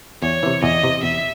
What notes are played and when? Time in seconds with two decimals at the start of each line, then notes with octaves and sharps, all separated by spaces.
0.22 E2 C#5
0.43 C3 E3
0.63 E2 D#5
0.83 C3 E3
1.03 E2 E5